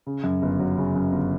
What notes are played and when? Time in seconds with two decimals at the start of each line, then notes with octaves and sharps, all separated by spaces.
0.07 C#3
0.24 F#2
0.42 G1
0.59 F#3
0.77 C#3
0.95 F#2
1.12 G1